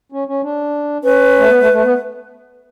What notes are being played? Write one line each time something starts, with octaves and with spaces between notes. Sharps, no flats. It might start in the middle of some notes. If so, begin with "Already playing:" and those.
C#4
C#4
D4
C#4 B4
A3
B3
A3
A3
B3